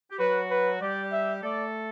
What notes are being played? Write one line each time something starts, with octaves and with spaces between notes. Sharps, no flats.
G4
F#3 F#4 B4
B4
G3 G4 D5
E5
A3 A4 D5